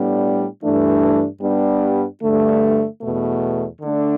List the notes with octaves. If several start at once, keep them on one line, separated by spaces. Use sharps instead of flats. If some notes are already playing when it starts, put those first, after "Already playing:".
Already playing: A2 G3 B3 D4
G2 E3 A3 D4
G2 G3 B3 D4
G2 D3 A3
E2 B2 A3
D3 A3 D4